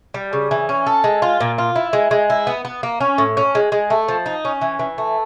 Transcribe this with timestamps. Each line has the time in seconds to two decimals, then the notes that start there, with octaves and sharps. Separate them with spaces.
0.14 G3
0.33 C#3
0.51 E3
0.69 C#4
0.87 A4
1.04 G#3
1.22 F4
1.40 A#2
1.58 F4
1.76 E4
1.93 G#3
2.11 G#3
2.30 E4
2.47 B3
2.65 B3
2.83 A#3
3.01 C#4
3.18 A2
3.37 C#4
3.55 G#3
3.72 G#3
3.90 A3
4.08 F3
4.26 D#4
4.45 C#4
4.61 E3
4.79 E3
4.98 A3